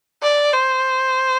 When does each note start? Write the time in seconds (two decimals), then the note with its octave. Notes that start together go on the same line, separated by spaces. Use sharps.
0.23 D5
0.53 C5